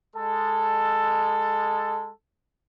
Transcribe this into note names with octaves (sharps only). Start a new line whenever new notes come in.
G#3 A4